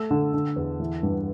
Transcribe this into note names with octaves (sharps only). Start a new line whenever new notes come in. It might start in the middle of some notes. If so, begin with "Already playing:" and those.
Already playing: A3 E6
D3
D3
E2
E3
G2